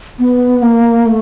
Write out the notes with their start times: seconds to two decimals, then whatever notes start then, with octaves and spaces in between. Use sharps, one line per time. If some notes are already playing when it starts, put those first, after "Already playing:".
0.19 B3
0.62 A#3
1.06 A3